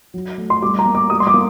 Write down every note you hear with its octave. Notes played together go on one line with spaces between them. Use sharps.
F#3
A3
C6
G3 D6
A#5
A#3
D6
G3 D#6
C6
D6
A#3